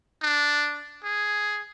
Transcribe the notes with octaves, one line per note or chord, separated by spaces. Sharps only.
D4
G#4